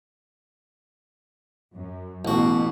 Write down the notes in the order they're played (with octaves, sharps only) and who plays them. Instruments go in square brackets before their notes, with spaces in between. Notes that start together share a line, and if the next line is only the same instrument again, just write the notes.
[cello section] F#2
[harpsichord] A1 F#4 [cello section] B2